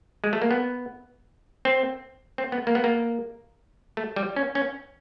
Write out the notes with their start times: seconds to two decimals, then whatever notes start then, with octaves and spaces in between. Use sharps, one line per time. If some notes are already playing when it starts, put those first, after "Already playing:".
0.24 G#3
0.33 A3
0.42 A#3
0.51 B3
1.65 C4
2.38 C4
2.52 B3
2.67 A#3
2.75 B3
2.84 A#3
3.97 A3
4.16 G3
4.36 C#4
4.55 C#4